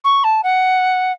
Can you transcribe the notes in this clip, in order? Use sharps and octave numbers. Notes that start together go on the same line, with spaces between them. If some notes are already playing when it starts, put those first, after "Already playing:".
C#6
A5
F#5